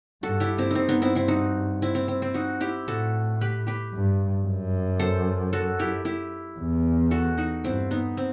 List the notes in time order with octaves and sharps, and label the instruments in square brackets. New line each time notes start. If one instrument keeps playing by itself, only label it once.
[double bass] G2 [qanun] F#4 A4
[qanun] E4 G4
C4 E4
[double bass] G2 [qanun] C4 D#4
[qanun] B3 D#4
C4 E4
C4 E4
D#4 F#4
C4 E4
C4
C4
C4
D#4 F#4
E4 G4
[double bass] A2 [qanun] F#4 A4
[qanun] G4 B4
G4 B4
[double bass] G2
F#2
[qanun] A4 C5
F#4 A4
E4 G4
E4 G4
[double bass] E2
[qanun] F#4 A4
D#4 F#4
[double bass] G2 [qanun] C4 E4
[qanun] B3 D#4
C4